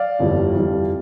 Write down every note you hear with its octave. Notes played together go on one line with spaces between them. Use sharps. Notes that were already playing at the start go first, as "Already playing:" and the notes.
Already playing: D5 F5
G1 F2 E3 G3
F2 E3 G3